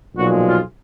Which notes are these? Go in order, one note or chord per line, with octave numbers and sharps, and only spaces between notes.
B1 A#2 F3 G#3 F#4
F4